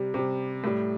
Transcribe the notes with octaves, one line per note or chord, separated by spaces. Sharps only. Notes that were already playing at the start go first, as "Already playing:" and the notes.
Already playing: C3 G3
C3 G3
A2 G3